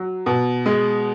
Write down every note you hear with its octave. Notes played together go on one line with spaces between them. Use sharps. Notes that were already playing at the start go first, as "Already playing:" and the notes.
Already playing: F#3
B2
G#3